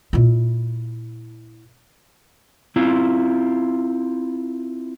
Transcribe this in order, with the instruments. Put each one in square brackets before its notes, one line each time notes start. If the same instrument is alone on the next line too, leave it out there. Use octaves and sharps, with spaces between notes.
[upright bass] A#2 E4
[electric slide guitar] C4 E4 F4